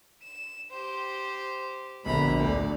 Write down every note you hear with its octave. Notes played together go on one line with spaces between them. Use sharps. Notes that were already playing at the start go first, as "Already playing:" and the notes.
E7
G4 C5
A#1 B2 D3 A#5 B5
D2 D5